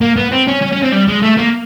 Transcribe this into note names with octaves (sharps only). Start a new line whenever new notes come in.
A#3
B3
C4
C#4
C#4
C#4
C4
G3
G#3
A3
A#3